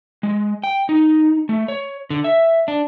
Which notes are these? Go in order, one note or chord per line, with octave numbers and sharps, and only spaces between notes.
G#3
G5
D#4
A3
C#5
D3
E5
D4